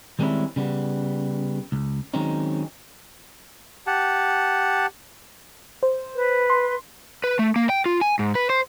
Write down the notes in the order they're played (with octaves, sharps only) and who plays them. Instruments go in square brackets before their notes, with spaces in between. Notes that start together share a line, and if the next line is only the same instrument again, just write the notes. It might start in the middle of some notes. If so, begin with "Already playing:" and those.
[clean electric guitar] D#3 G3 G#3 C4 C#4 E4
C#3 G3 B3
C#2
D#3 F#3 G#3 C4 C#4 D#4
[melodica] G4 F#5 A5
[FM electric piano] C5
[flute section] B4
[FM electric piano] C6
[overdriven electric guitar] B4
A3
A#3
G5
F4
G#5
G#2
B4
C5